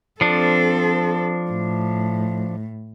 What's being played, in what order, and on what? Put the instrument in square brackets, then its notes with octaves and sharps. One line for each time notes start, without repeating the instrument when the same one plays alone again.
[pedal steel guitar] F3 D4 [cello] C4 A4
[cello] A2